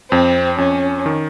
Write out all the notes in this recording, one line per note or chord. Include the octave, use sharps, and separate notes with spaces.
F2 C4
F2 C#4
D#3